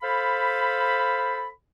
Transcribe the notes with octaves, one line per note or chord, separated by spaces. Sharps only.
A4 C5 F5 B5